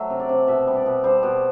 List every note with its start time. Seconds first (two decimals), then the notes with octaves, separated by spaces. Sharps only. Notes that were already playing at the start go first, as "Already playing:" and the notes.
Already playing: F#3 A3 E5
0.10 C3
0.20 D5
0.29 C3
0.47 B2 E5
0.67 G3
0.77 D5
0.86 B2
1.04 G3 C5
1.23 B2